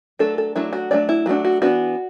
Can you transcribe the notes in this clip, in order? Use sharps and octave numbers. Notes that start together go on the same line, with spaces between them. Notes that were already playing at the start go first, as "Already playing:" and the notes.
F#3 A3 D4 A4
A4
F#3 A3 D4 E4
F#4
F#3 A3 D4 D5
E4
F#3 A3 D4 F#4
F#4
E3 B3 D4 F#4